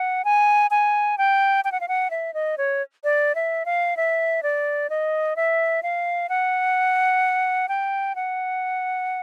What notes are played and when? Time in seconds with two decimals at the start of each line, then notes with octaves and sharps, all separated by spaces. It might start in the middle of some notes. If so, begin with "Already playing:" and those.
Already playing: F#5
0.25 G#5
0.71 G#5
1.18 G5
1.65 G5
1.72 F#5
1.81 F5
1.88 F#5
2.10 E5
2.34 D#5
2.58 C#5
3.04 D5
3.35 E5
3.66 F5
3.97 E5
4.43 D5
4.90 D#5
5.36 E5
5.83 F5
6.29 F#5
7.69 G5
8.15 F#5